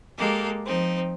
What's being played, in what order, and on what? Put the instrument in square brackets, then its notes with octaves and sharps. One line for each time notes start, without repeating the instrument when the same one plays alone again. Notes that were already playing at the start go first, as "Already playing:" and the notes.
[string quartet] G#3 A#3 G4 A4 A#4
F3 C4 D#4